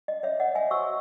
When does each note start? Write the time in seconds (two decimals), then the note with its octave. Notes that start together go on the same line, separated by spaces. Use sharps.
0.08 D#5
0.23 C#5 E5
0.40 D#5 F#5
0.55 E5 G#5
0.71 F#4 C5 C#6 E6